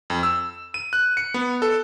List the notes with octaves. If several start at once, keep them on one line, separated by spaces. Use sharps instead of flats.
F2
E6
D#7
F#6
C#7
B3
A4